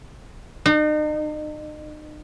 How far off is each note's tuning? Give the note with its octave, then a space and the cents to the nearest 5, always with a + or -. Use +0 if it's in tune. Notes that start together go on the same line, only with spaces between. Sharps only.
D#4 -40